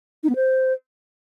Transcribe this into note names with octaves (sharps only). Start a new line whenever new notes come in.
D#4
B3
C5